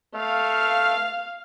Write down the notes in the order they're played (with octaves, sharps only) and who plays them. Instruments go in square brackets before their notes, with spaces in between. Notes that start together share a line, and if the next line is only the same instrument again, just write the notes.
[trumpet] A3 [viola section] F5